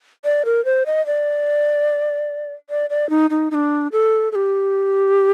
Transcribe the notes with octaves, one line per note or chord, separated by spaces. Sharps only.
D5
A#4
C5
D#5
D5
D5
D5
D#4
D#4
D#4
D4
A4
A4
G4